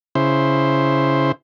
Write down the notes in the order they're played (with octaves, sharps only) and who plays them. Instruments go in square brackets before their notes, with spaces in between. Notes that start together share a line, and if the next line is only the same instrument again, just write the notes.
[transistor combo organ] C#3 E4 C5